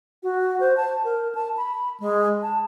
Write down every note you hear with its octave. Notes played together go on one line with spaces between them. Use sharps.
F#4
C5
A5
A#4
A5
B5
G#3
A5